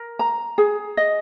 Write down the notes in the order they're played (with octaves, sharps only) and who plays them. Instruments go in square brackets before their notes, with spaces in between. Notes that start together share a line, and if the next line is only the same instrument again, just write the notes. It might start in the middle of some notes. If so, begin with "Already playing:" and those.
Already playing: [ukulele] A#4
A#5
G#4
D#5